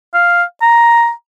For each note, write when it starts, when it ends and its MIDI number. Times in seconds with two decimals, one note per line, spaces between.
0.14 0.43 77
0.62 1.11 82